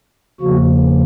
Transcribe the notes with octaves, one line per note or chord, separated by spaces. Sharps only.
E2 C#3 F3 A#3 F#4